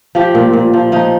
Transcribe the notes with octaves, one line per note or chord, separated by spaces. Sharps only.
F3 G4
A#2
A#2
F3
F3 D#4